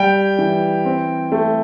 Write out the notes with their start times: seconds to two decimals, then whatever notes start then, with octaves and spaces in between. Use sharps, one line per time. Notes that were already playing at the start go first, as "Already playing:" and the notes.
Already playing: G3 G5
0.39 E3
0.85 C4
1.32 A3